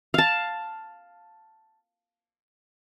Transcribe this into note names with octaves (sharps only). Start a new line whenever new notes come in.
F5 A5